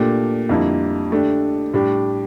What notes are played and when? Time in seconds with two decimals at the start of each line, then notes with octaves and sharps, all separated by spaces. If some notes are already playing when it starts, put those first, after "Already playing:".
Already playing: A#2 A3 D4 G4
0.49 F2 D3 G3 A#3 E4
1.11 D3 A3 D4 G4
1.73 A2 G3 D4 G4